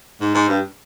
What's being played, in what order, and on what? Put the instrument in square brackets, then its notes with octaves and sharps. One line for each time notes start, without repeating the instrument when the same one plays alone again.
[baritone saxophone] G#2
G#2
G2